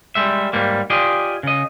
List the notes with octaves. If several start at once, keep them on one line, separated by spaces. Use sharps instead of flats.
G3 G#3 E5
G#2 G3 A#3
F4 G4 G#4 D5 D#5
C#3 D#5